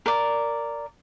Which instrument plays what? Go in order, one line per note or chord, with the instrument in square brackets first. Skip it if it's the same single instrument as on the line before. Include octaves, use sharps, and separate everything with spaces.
[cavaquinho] A#4 D5